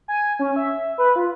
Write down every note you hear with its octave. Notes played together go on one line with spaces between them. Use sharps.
G#5
C#4
E5
B4
F4